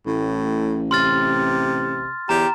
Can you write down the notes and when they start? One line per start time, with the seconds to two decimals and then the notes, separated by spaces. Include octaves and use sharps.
0.06 A1 A2
0.91 C3 C6 F6 A6
2.29 E2 G4 A#5